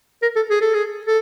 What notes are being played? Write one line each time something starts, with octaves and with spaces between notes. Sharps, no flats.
A#4
A4
G#4
A4
G#4
A4